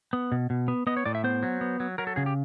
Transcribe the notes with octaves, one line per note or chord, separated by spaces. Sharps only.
B3
B2
B2
B3
B3 D#5
C#5
A2 D5
E5
B3 C5
F#3
B3
F#3
F#3 A#4
A4
C#3 G#4
G4